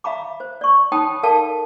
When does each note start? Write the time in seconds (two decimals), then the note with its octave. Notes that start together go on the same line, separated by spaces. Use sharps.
0.04 E5 F5 A#5 B5 D6
0.40 C5
0.61 D5 C#6
0.92 D#4 C#5 G5 A5 B5 D#6
1.23 A4 A#4 D5 F5 G5 A5